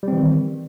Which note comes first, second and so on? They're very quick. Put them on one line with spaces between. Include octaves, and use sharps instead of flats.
G3 C4 E3 D#3